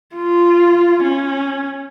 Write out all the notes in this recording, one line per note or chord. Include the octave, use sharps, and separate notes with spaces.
F4
C#4